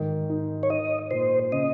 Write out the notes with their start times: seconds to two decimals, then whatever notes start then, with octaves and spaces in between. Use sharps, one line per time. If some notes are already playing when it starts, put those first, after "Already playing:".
Already playing: G#2 D#3
0.30 D#4
0.63 C#5
0.70 D#4 D#5
1.11 A#2 C5
1.52 C#3 D#5